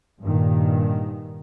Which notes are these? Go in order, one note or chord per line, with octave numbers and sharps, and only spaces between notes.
G2 A#2 D#3